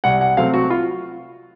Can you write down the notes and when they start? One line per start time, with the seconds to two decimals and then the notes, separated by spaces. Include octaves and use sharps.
0.04 C2 F#5
0.21 F#5
0.37 C3 F#3 A3 C4 F5
0.54 F#4
0.70 F4